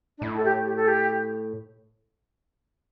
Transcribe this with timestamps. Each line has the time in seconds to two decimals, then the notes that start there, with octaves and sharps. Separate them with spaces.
0.17 D4
0.22 A2 E4
0.36 A4
0.44 G4
0.65 G4
0.76 A4
0.87 G4